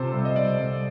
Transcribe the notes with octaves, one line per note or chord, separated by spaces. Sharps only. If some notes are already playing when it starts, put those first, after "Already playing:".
Already playing: C3 F4 G4 A4 C5
C2
D#5
C2 D5
C2